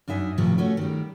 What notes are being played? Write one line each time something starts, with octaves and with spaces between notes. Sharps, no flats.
F#2 D4 D#4 E5 G#5
A2 C3 D#3 F3 G3
A3 C#4 F#4
D#3 G3